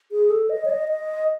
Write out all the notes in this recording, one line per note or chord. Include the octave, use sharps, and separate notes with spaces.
G#4
A4
D#5
C#5
D#5
D#5